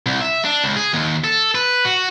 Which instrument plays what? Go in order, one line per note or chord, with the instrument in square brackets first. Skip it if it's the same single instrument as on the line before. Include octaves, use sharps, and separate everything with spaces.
[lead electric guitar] C2
E5
D4
C#2
G#4
D#2
A4
B4
F#4